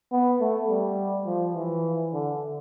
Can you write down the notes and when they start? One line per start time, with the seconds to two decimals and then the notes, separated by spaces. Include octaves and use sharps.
0.12 B3
0.40 A3
0.69 G3
1.26 F3
1.55 E3
2.13 D3